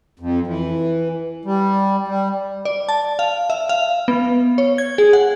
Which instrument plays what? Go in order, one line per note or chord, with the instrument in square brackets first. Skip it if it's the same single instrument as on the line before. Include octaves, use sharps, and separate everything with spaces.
[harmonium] F2
E3
G3
G3
[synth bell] D5
A5
F5
E5
F5
B3
C#5
G#6
G#4
F#5